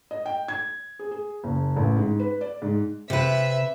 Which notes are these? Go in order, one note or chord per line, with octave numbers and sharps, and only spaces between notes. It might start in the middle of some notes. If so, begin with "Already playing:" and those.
D#5
G5
G#6
G#4
G#4
F#1
A1
G#2
B4
D5
G#2
C3 B4 E5